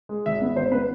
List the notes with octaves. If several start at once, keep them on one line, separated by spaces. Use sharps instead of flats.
G#3
G#1 E5
B3
G#1 C5
B3 B4